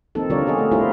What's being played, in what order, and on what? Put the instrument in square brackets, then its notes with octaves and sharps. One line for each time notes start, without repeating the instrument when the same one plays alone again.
[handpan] F3 A#3 C4 D#4 A4
D3 G3 F4 A#4 C#5 D5
B3 G#4 D#5
A3
G3 A#3 E4 F4 A#4 C5